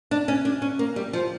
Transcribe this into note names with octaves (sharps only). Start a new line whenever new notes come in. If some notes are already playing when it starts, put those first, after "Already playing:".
D4
C#4
D4
C#4
A#3
G3
F3